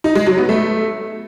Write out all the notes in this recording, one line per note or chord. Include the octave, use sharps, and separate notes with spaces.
D#4
G#3
F#3
B3
A3